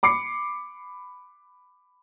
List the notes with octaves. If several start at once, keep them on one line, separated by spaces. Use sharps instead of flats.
B5 D6 C7 C#7